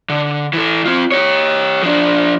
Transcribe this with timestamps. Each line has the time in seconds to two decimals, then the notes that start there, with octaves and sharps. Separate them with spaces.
0.09 D3
0.53 E3 A4
0.86 C4 F4
1.12 G4 C#5
1.83 F3 D4